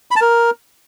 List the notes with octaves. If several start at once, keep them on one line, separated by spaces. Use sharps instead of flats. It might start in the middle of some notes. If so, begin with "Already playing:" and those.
B5
A5
A#4